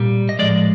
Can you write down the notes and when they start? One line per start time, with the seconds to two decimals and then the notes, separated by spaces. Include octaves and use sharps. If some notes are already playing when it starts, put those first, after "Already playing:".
Already playing: A#2 G3
0.29 D#5
0.39 A2 F3 G#3 D5